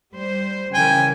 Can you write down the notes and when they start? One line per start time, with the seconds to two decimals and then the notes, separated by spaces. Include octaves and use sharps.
0.12 G3 C5
0.74 C#3 E3 A#4 G5 G#5